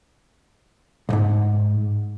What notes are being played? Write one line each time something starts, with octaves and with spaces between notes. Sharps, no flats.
B1 G#2